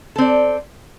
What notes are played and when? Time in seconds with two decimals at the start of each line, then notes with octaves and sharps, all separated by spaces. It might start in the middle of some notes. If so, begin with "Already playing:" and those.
0.16 A4
0.18 C4
0.21 D5